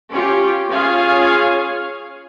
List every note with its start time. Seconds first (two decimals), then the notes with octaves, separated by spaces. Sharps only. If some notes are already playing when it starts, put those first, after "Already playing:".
0.11 C#4 F4 G4
0.69 C#4 F4 G#4 C#5 F5